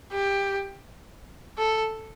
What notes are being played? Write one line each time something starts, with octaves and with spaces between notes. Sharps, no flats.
G4
A4